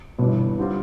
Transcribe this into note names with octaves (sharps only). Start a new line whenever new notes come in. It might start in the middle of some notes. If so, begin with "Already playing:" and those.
G1 G2 B2 E3
D3 G3 C4 F4